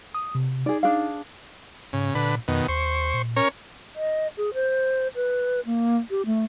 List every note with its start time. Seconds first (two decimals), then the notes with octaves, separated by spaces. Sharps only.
0.15 D#6
0.35 C3
0.66 D#4 G#4 D5
0.83 D4 G#4 F5
1.93 G#2 C#3
2.15 A#2 D3 B4
2.48 F2 B2 D#3
2.68 D#2 C5 C#6
3.14 A#2
3.36 C#4 A#4 C#5
3.95 D#5
4.37 G#4
4.54 C5
5.15 B4
5.66 A#3
6.10 G4
6.26 A3